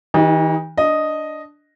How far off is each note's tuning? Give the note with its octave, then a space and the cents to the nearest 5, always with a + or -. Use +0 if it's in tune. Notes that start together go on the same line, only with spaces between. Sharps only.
E3 -40 D#4 +10 G4 +0
D4 +0 D#5 +0